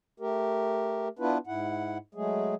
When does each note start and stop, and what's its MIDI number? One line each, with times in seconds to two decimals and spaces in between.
0.20 1.08 57
0.20 1.08 67
0.20 1.08 70
1.19 1.38 59
1.19 1.38 62
1.19 1.38 64
1.19 1.38 65
1.19 1.38 71
1.47 1.98 44
1.47 1.98 64
1.47 1.98 78
2.15 2.55 54
2.15 2.55 56
2.15 2.55 57
2.15 2.55 68